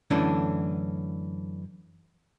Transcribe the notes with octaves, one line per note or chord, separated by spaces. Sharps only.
F#2 D3 E3 A3 C#4 D4